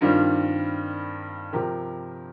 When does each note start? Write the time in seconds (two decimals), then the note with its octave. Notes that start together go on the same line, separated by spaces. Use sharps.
0.01 G2 D#3 G3 C4 F4
1.52 C3 F3 C4 G4 A#4